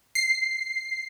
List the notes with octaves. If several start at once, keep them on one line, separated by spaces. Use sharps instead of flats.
C7